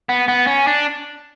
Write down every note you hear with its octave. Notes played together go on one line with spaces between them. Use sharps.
B3
B3
C#4
D4